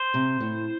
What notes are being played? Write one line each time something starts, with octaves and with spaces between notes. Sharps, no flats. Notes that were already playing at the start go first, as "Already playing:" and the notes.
Already playing: C5
C3
A2